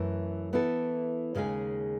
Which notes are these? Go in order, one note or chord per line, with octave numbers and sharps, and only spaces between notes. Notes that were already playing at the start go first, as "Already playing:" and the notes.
Already playing: F#2 E3 A3
E3 B3 E4 A4
D#2 C#3 G#3 D#4 G#4